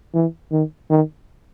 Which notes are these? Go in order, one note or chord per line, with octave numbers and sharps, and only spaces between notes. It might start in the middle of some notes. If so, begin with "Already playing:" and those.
E3
D#3
D#3